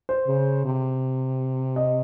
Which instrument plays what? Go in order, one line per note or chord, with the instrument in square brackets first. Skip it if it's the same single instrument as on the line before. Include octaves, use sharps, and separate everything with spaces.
[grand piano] C5
[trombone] C#3
C3
[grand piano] D#5